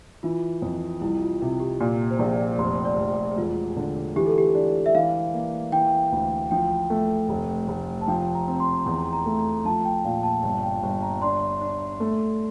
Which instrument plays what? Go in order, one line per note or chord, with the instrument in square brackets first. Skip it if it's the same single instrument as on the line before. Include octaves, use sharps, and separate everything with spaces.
[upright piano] E3 [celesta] F4
[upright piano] F2
[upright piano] C2 [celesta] E4
[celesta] F4
[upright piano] C3 [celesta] F4
[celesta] G4
[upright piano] A#2 [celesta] G4
[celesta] C5
[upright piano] A#1 [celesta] D5
[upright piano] F1 [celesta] C6
[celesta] D5
[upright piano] F1
[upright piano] E1 [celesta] F4
[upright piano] D3
[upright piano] E3 [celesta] G4
[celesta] A4
G4
[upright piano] D4
[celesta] E5
[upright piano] E3 [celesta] F5
[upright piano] A#3
[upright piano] E3 [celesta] G5
[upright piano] D2
[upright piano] F3 [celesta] G5
[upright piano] A3
F1
F1
[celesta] A5
[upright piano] F3 [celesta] G5
[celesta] A#5
[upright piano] C4
[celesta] C6
[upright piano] E2
[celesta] A#5
[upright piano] A3
[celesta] A#5
[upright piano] F3 [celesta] A5
[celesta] G5
[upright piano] A#2 [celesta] F5
[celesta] A5
[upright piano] G1 [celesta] A5
[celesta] G5
[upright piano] G1
[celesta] A#5
[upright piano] D4 [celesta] C6
[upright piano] D4
A3